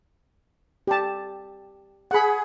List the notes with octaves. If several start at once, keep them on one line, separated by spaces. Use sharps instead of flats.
G4 A5
G#4 F#5 B5